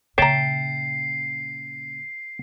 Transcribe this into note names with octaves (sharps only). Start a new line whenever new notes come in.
A#2 C#3 C#5 E5 G5 A5 A#5 C7